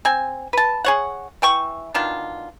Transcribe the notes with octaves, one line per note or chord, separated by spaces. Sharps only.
C4 G#5
B4 A5
G#4 C#5 F#5
E3 G5 C#6
B2 D#3 D4 F4